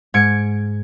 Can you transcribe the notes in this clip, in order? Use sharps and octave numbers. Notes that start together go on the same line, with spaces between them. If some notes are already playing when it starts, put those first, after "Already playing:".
G#2 G#6 C#7 D7